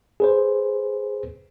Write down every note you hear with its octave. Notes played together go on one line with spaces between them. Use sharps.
G#4 B4 C5